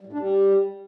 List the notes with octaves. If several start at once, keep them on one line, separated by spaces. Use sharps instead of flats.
G3
A2
D4
G3